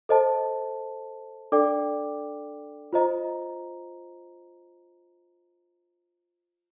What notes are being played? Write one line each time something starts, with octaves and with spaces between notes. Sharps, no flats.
A4 C5 D#5 A5
D4 A4 D5 G5 D6
F4 C5 D#5 A#5